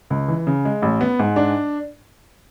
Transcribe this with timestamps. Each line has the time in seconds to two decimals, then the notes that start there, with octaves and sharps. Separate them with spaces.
0.10 C#2
0.28 E3
0.47 C#3
0.65 G#3
0.82 A1
1.01 B3
1.19 G#2
1.36 D4